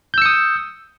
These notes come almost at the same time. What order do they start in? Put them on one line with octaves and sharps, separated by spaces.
G6 E6 C#7 D#6